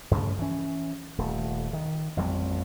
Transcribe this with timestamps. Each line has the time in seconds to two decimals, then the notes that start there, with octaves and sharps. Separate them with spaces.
0.11 G2 C#3 F3 A3
0.39 E3 C#4
1.18 D#1 A3
1.73 D#3
2.17 A1 F2 G3 C4